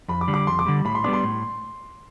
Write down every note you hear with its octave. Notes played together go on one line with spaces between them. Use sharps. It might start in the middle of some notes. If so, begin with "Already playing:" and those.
F2 B5
D6
D3 G3
D6
F2 C6
D6
D3 G3
A2 B5
C6
G3 B3 D4 D6
C6
A2